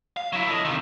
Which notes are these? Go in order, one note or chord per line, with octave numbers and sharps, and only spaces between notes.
F5
F#3 E4
A4 D#5
C3 D#3